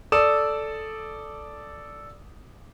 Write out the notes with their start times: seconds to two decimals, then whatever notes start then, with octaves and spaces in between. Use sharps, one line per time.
0.12 A4 D5 D#6 E7